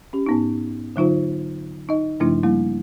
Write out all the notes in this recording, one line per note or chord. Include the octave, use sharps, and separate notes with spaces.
C#4 G4
G#2 B3 D#4
D3 F#3 D#4 F4 C5
D#4 D#5
G2 C#3 F3 A3 D4 E4
G3 A#3 E4